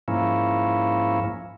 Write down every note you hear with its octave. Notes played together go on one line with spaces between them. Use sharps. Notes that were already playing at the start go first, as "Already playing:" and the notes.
G#2 F3 A#3 C#4 E4